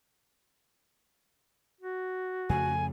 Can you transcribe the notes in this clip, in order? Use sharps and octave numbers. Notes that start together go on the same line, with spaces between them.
F#4
F2 C#3 A3 G#5